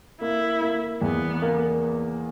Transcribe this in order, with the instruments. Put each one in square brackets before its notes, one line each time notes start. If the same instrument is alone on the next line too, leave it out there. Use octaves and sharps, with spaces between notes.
[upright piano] A#3 [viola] E4
[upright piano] A#3
[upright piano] E2 [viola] B3
[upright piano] A#3